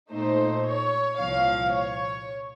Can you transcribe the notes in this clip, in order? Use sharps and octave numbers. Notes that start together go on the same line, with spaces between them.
A#2 A3 D#4 C5
C#5
C2 A#2 F3 F5
C#5